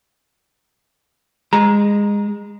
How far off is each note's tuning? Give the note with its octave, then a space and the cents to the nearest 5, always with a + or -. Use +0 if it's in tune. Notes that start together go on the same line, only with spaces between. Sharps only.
G#3 -20 A#5 +15